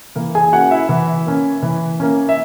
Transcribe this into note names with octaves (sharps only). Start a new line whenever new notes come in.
E3 A#3 A#4
G#4 G#5
A#3 C#4 F#4 F#5
E4 E5
E3
A#3 C#4
E3
A#3 C#4
E5